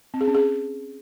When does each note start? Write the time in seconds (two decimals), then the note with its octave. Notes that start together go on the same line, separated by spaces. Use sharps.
0.14 C4
0.21 G#4
0.28 C#4
0.34 G#4